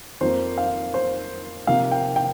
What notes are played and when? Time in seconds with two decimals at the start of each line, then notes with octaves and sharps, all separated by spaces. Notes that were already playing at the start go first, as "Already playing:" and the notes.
0.21 F2 F3 A#3 C5
0.58 F5
0.94 C5
1.67 C3 F3 A#3 F5
1.91 G5
2.16 G5